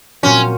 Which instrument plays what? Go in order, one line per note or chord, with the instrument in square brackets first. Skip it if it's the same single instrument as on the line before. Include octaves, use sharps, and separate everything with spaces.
[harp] A#2 F#3 C4 F#4 [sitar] C#4